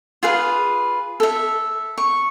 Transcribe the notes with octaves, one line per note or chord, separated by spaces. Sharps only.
F4 G#4 B4
A4 E5
C#6